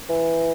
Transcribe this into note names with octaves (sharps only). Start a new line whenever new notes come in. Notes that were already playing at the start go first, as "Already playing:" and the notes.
E3